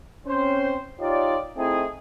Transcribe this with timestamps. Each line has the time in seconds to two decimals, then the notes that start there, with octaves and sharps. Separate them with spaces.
0.27 C4 C#4 C5
1.00 D#4 F4 G4 C#5 D5
1.57 A3 C4 D#4 E4 G#4